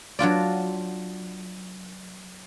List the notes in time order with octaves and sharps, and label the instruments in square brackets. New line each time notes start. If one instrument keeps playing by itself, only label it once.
[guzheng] F#3 D4 F4 D5